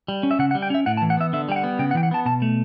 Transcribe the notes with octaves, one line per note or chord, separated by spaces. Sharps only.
G3
C#4
E5
C#3 F#5
F#5
G3
G5
C#4 E5
A2 F#5
A5
E3
F#5
B3 E5
D3 E5
G3 G5
F#5
B3
C#3 G5
F#5
E3 G5
F#5
B3 A5
B2 A5
A3